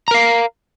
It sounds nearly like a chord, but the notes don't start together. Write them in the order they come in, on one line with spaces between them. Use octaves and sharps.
A#5 A#4 F5